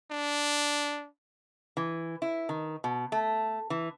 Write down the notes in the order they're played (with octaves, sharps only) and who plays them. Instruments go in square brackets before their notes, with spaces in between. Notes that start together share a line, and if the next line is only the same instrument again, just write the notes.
[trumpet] D4
[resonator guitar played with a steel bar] E3
E4
D#3
B2
A3
E3